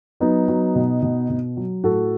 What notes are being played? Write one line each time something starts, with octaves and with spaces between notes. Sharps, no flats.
F#3 B3 D#4
F#3
B2
B2
B2
F#3
A2 F#4 A4